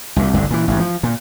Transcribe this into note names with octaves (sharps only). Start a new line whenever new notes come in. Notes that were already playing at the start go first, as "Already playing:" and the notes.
C2 A#2
G1 C2 D3
A#2 E3
A1 G#2
F3
A#2